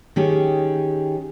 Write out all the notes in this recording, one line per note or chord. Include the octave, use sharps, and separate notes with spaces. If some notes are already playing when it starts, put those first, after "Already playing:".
D#3 C#4 G4 G#4